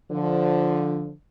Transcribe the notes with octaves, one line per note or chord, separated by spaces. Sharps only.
D3 F3